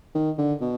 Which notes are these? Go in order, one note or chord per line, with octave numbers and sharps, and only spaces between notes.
D#3
D3
B2